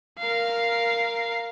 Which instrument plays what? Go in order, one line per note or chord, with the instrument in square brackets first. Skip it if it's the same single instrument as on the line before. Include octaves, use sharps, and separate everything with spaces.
[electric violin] A#4 F5